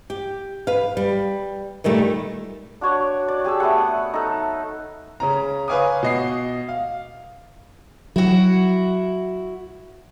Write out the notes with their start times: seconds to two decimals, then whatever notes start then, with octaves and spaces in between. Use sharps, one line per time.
0.10 G4
0.67 B4 F5
0.97 G3
1.84 A#2 D#3 G3 A3
2.81 D4 F#4 C#5 D5
3.28 D5
3.44 G4 G#4 A5 E6
3.60 A3 B3 A4 F#5
3.78 D#6
4.14 D#4 A4
5.20 C#3 C#4 A#5
5.68 B4 C#5 F5 G#5 D6 D#6
6.03 B2 D#5 C7
6.69 F5
8.16 F#3 E4 F#4